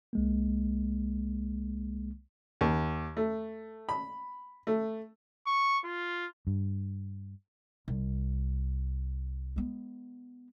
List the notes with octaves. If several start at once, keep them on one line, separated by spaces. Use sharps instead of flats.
C2 G#3 A#3
D#2
A3
B5
A3
C#6
F4
G2
C2
G#3 B3